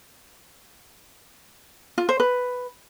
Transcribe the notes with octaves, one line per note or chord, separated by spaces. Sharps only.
F4
C5
B4